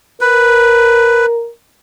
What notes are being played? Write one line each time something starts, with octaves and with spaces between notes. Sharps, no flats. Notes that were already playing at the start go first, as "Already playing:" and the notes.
A#4 B4